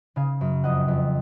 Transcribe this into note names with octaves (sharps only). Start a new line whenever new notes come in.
C#3 F5 G#5
F#2
F2 D#5 F#5
F2